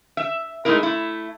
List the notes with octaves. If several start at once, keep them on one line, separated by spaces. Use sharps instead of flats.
E5
G#3 A3 D#4 E4 A#4
A3 E4